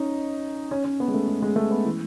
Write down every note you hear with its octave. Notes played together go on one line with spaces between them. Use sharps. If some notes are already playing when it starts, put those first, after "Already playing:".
Already playing: C#4 D#4
C#4
C#4
B3
G#3
A3
G#3
G#3
A3
B3
E3